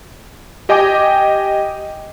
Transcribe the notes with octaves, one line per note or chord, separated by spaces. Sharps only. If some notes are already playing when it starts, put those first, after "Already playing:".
G4 D#5 G5 G#5 D6